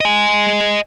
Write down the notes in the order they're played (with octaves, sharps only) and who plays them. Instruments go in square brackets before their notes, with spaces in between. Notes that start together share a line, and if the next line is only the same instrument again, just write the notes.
[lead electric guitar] D#5 G#5